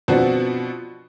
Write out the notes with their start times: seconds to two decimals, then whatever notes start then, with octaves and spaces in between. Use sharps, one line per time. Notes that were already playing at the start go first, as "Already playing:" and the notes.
0.08 B2 F3 B3 C4 D4 F#4